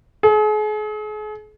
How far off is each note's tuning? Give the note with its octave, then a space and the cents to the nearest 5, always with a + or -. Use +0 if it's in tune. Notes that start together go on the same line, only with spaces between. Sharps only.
G#4 +40